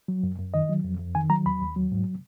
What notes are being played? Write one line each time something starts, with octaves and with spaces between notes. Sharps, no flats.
F#3
F#2
F#2
D#3 D#5
F#3
F2
F2
D#3 G#5
F#3 A#5
D#2 B5
D#2
F#3
G#2